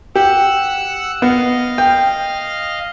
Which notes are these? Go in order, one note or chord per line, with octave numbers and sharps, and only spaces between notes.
G4 F#5 E6 F#6
B3 D#5 F5
G5